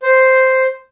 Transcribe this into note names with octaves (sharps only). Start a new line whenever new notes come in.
C5